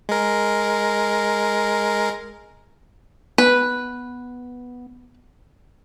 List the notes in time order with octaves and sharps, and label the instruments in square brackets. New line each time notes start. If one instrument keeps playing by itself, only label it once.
[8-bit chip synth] G#3 A#4
[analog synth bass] B3 [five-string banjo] B4